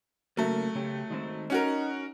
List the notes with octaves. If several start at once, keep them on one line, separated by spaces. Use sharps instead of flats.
C#3 F#3 A3 A#3
C#3 C#4 G4
D#3 G#3 C4
C#4 D#4 F#4 A#4